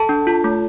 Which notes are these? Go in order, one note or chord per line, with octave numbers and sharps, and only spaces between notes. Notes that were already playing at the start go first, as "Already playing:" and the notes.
Already playing: A4 A5
D4
F4
A3